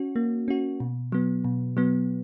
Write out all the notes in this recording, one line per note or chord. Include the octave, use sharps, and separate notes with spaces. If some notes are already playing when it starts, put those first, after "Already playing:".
Already playing: C#4 F#4
A#3
C#4 F#4
B2
F#3 B3
B2
F#3 B3